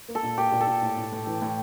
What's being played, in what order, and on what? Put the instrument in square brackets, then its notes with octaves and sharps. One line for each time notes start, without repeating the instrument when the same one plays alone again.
[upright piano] A#3
[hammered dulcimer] A4
[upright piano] A#2
[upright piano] A#3 [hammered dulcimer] G4
[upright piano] A#2
[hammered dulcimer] A4
[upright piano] A#2
A2
A2
A2
E3
A2